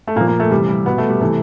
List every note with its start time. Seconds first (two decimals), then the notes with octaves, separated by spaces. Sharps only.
0.07 A3
0.16 A#2 A#3
0.21 F3
0.28 A#3
0.40 A3
0.51 C3 E3 G3
0.69 G3
0.86 B2 B3
0.98 A3
1.09 G3
1.21 C3 E3 A3